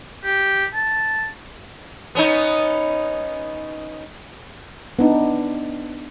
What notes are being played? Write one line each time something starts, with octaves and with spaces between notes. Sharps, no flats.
G4
A5
B3 C#4 D#4
B3 D4 D#4